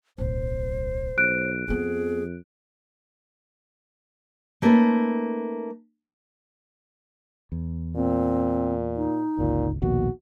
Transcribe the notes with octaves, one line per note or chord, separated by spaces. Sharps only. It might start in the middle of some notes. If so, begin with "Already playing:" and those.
D1 B1 C5
B1 F#6 D7
F2 F3 B3 G#4
A3 A#3 C#4 D#4 A4 B4
E2
A#2 C4
D#4
G1 C#2 A#2
A#1 D#2 B2 F#4